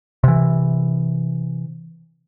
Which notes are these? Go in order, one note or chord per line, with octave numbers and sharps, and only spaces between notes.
C3 E3